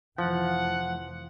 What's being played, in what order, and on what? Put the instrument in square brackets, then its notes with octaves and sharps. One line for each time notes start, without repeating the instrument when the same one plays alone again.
[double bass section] F1 E3 [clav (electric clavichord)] F3 [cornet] F#5